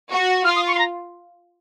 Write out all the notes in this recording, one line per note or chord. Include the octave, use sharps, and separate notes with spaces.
F#4
F4 F6
D#6
C#6
C6
A#5